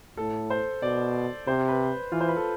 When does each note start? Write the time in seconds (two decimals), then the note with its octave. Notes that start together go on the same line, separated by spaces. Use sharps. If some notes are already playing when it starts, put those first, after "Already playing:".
0.17 A2 A4
0.50 C5
0.82 B2 D5
1.47 C3 C5
1.68 B4
2.12 E3 F4
2.21 C5
2.29 B4
2.36 A4